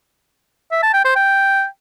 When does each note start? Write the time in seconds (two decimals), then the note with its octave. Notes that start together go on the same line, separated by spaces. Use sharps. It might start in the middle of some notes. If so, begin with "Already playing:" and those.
0.71 E5
0.83 A5
0.94 G5
1.05 C5
1.16 G5